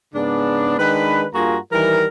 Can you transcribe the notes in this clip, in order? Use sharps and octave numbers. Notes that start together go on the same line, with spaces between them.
G#2 C#3 B3 D4
D#3 G#3 D4 B4
G2 A#3 F4 F#4 G#4 A#5
D#3 E3 G3 A#4